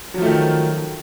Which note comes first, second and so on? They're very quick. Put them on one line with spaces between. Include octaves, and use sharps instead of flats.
F#3 F3 A3 D#3